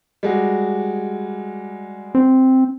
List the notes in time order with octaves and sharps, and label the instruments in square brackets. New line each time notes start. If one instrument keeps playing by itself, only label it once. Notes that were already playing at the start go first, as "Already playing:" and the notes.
[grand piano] G3 G#3 F#4
[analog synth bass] C4